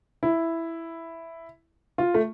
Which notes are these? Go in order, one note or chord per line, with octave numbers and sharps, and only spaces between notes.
E4
F4
A3